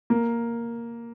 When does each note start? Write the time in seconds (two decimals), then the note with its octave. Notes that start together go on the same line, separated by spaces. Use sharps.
0.10 A#3